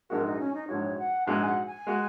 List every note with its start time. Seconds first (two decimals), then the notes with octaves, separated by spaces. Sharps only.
0.10 A#1 G#2 G#3 F#4 A#4
0.25 D#4
0.40 C#4
0.54 D#4
0.68 A#1 G#2 G#3 F#4 C#5
0.98 F#5
1.27 A#1 G#2 G#3 F#4 G#5
1.46 F#5
1.66 G#5
1.87 G#3 F#4